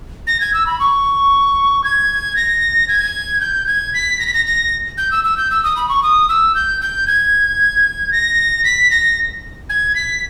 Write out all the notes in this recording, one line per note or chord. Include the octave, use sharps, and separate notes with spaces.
A#6
G#6
E6
B5
C#6
G#6
A#6
G#6
G6
G#6
B6
A#6
B6
A#6
A#6
G6
E6
E6
G6
E6
D#6
B5
C#6
D#6
E6
G6
G6
G#6
A#6
B6
A#6
G#6
B6